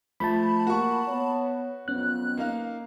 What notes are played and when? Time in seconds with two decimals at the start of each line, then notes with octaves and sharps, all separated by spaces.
0.20 F3 A3 A5 B5
0.67 A#3 F#4 C#6
1.08 B3 C#5
1.88 F2 F#3 B3 C#4 F#6
2.37 A#3 D#4 F5